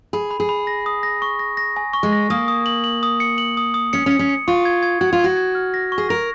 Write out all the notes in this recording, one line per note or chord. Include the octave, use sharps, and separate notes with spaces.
G#4 B5
B5
G#4
B5
A#6
D#6
A#6
C#6
A#6
A#6
G#5
C#6
G#3
A#6
A#3 D#6
D#6
F#7
F#7
D#6
C#7
F#7
D#6
D#6
C#4 C#7
C#4
C#7
C#4
C#7
F4 C#6
G#6
G#6
F#4 G#6
F4
F#4 G#6
G#6
F6
A#6
C#6
G#4
A#4 A#6